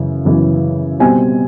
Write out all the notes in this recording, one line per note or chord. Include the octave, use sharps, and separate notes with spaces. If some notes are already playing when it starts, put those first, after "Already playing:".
Already playing: F#2 C#3 E3
F#2 C#3 E3
B2 G3 C4 G#5